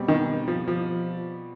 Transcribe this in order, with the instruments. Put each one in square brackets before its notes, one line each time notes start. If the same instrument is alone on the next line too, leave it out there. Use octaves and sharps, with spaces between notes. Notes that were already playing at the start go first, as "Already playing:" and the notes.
Already playing: [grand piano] B2 G3 C4
[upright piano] D#3
F3
F3